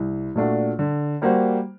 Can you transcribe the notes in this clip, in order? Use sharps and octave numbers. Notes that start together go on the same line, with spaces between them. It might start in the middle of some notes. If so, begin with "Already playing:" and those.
Already playing: C2
A#2 A3 D4 F#4
D3
G3 A#3 F#4 C5